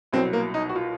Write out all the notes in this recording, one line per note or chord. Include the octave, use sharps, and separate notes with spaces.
C2 B2 F#3 C4
A#3
D#4
F#4
F4